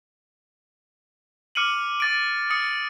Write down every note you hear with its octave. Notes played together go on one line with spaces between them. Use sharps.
D6 F6 C#7 D#7 F#7
D6 A6 D7
D#6 C#7